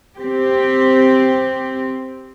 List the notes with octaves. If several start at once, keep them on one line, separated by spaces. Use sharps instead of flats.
C4 G4